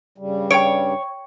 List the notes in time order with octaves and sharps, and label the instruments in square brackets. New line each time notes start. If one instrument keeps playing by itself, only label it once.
[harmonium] G2 C#3 G3
[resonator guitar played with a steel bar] C#5 [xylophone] G5 D7